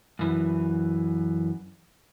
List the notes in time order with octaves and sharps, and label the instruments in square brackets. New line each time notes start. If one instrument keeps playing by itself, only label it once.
[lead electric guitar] F#2 E3